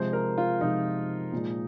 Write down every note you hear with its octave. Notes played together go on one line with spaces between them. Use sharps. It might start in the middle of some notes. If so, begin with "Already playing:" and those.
Already playing: C3 F3 G#3 C5
A#4
F4
C3 F3 G#3 D#4
A#2 F3 G#3